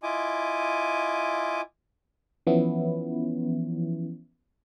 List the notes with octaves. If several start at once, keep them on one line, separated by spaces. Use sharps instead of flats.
E4 F4 D#5 G#5 D6
E3 F3 B3 C#4 E4